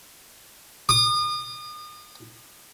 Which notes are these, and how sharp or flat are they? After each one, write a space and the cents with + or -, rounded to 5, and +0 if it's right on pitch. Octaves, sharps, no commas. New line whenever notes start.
D#6 -40